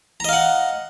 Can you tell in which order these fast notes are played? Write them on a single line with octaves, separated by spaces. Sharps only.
A#5 D#5 F5 F#5